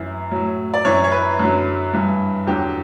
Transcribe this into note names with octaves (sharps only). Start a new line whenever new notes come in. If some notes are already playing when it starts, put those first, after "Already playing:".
Already playing: F#2 E3
A2 F#3
D5
F#2 E3 C#5
C#5
B4
F#2 D3 F#3
G2 E3
E2 D3 F#3 G4